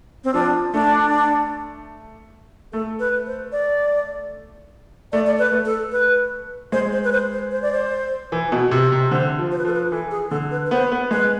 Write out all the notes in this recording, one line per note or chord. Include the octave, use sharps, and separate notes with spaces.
C4
F3 D4
A3 D4
A3 A4
B4
C5
D5
A3 D5
D5
B4
A3
A4
B4
G#3 C5
C5
B4
C5
C5
C5
D5
C5
E3
B2
C3
C3
D3 C5
F3
C5
B4
F3 A4
B4
E3 A4
G#4
D3 A4
B4
B4
B3 C5
B3
G#3 B4